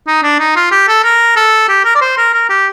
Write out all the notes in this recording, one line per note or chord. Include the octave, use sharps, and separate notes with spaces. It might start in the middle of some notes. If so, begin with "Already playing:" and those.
D#4
D4
D#4
F4
G4
A4
A#4
A4
G4
A#4
D5
C5
A#4
A#4
G4